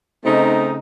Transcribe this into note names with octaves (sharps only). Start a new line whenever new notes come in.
C#3 A3 C4 D#4